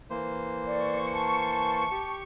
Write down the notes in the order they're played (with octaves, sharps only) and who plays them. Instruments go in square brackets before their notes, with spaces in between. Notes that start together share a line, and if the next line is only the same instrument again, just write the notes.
[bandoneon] E3 A#3 C5
[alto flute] D5 [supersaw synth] C#6 C#7
[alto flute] A5
[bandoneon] G4